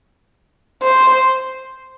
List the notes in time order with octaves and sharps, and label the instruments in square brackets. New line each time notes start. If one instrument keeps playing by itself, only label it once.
[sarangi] C5